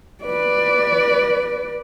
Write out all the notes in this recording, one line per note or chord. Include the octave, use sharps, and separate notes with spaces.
B4 D5